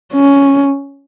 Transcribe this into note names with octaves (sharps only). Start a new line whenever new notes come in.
C#4